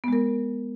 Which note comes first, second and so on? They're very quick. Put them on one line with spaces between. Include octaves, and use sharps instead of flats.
B3 G#3 A#4